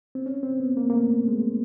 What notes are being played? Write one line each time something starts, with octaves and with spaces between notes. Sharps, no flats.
C4
C#4
C4
B3
A#3
A#3
A3
G#3